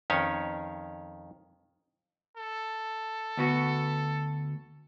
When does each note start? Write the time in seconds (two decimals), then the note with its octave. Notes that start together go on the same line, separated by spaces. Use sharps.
0.10 F2 D#3 C#4 C#5
2.37 A4
3.37 D2 B3 F#4